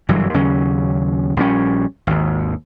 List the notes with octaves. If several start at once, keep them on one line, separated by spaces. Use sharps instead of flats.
F#1 G2 E3 F#3
D#2 C#3 F#3 C#4
A#1 G3 C4 C#4
G#1 D#2